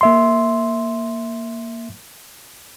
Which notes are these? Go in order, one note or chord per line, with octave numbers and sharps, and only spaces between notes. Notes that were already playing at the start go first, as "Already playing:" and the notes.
A#3 E5 C6